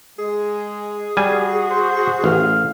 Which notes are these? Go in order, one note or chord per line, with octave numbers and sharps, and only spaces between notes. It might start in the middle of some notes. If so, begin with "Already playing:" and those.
G#3 G#4
G3 F#4 G#5
C5
A1 F5